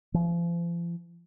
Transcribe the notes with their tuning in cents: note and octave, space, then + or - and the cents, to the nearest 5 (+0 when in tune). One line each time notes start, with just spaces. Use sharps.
F3 -40